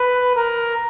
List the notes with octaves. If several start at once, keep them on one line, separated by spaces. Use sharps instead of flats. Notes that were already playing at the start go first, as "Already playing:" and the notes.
Already playing: B4
A#4